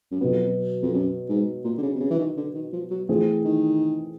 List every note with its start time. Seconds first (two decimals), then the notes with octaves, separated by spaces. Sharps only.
0.12 F#2
0.21 F2 B2 F#3 B3
0.82 F2
0.93 F#2
1.29 G#2
1.65 A#2
1.78 D3
1.83 C#3
1.95 C3
2.01 C#3
2.11 E3
2.19 D#3
2.37 D3
2.54 D#3
2.73 F3
2.91 F#3
3.09 E3 F3 A3 C4 E4 G#4
3.45 D#3